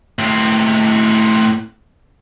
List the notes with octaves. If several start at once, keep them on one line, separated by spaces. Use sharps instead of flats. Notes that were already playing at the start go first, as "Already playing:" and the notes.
A2 C4